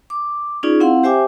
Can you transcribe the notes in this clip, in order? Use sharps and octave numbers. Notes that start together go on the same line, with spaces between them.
D6
C#4 D#4 F4 G#4 D5
C4 E4 F5 F#5 C6
G4 C5 E5 G5 G#5 D6